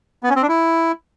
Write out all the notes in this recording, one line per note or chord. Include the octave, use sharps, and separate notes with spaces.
B3
C#4
C4
D4
E4